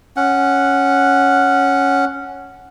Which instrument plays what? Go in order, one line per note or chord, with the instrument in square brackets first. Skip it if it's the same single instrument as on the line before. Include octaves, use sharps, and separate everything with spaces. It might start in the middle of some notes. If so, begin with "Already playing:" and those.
[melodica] C#4 F#5